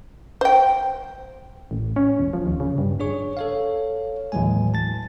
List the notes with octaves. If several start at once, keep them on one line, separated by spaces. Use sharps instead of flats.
C5 G5
A1
C#4
E1
F3
D#2
C#3
G2
D4 G#4 C#5 C#6
A4 C#5 F5
D#2 A2 E3 F#3 G#3 G#5
A5 A6